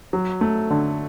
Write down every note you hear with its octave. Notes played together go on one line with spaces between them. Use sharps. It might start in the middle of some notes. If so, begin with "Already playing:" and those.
F#3
A3
D3